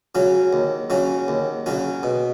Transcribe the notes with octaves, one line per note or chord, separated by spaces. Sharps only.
C#3 F#3 C#4 F#4
D#2
C#3 F#3 C#4 F#4
D#2
C#3 F#3 C#4 F#4
B2